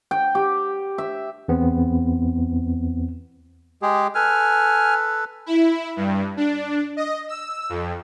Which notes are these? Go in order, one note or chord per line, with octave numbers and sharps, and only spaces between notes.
G5
G4
E5
E2 B3 C4
G#3 G4 G#4
A4 B4 G#5 F6
E4
G2
D4
D#5
E6
F2